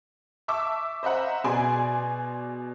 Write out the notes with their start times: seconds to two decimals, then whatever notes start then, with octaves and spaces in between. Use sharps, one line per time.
0.48 E5 A5 C#6 D6 E6
1.03 C5 D#5 E5 F#5 A#5
1.44 B2 G#4 D5 G#5 C6 D7